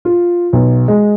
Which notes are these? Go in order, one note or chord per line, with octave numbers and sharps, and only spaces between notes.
F4
B1
G#3